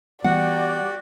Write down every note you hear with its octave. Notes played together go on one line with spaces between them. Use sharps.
E3 G3 B3 F#4 G4 D5 F#5